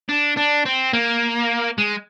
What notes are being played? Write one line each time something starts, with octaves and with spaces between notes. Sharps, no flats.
D4
D4
C4
A#3
G#3